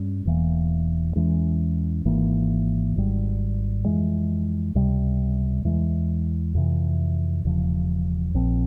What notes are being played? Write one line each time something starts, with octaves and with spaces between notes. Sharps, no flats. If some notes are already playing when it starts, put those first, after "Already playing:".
Already playing: G2 G3 C#4
E1 E2 E3 A#3
E2 E3 G#3 C#4
G#1 G#2 E3 A#3
G#1 G#2 G3
F2 E3 G#3
C#2 C3 G3
E2 E3 G#3
F2 C3 E3
E1 E2 C#3 F3
A#1 A#2 F3 C4